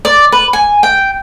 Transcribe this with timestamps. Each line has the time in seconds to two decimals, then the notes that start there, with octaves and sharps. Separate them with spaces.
0.05 D5
0.32 B4
0.53 G#5
0.83 G5